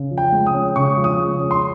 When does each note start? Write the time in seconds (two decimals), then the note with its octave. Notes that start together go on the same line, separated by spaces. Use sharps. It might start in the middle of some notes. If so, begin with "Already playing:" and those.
Already playing: C#3
0.11 F3
0.18 G5
0.32 G#3
0.46 D#6
0.54 C#4
0.76 C#3 C#6
0.97 F3
1.04 D#6
1.19 G#3
1.40 C#4
1.51 C6